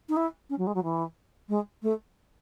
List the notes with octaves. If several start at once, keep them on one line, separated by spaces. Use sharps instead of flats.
D#4
E4
C#4
F#3
G#3
F#3
E3
G#3
A3